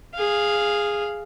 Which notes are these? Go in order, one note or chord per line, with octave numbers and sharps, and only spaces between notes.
G#4 F5